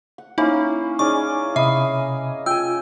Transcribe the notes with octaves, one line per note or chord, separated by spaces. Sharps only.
F#5
A#3 C#4 D#4 E4
C#4 D#4 G#4 D5 C#6
C3 D#5 E5 B5 D#6
F4 G5 G#5 E6